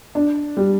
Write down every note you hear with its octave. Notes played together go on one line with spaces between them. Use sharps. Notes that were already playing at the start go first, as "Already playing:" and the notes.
D4
G3